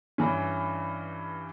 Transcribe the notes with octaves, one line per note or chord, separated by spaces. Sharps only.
G2 E3 C#4